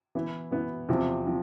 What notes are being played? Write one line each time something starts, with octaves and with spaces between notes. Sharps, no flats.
E3 B3 E4
E3 B3 E4
E2 C3 F3 C4
F3 C4